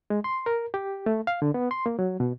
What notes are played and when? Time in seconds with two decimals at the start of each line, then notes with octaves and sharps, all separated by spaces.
0.10 G#3
0.24 C6
0.46 A#4
0.74 G4
1.06 A3
1.27 F5
1.42 D3
1.54 B3
1.71 C6
1.86 A#3
1.99 F#3
2.20 B2